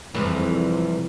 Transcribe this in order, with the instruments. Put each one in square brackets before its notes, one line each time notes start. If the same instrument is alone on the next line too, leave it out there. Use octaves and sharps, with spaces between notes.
[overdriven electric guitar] C2 [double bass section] F2 [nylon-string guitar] E3 G#3